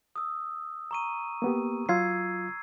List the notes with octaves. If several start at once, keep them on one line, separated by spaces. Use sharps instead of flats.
D#6 E6
A#5 C#6 D#7
A#3 B3 G4
F#3 F4 E6 G#6 C7